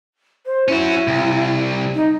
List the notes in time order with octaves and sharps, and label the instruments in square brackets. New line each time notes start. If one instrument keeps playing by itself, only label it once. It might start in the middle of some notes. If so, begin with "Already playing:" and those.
[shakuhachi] C5
[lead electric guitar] C#4 F#4 [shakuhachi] E4
[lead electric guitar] C2
[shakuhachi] D#4